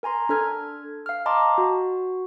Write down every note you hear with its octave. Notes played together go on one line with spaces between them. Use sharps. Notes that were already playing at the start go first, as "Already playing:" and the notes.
A#4 G#5 A#5 C6
D4 A4 F6 G#6
F5 F6
D#5 A5 A#5 C6 D6
F#4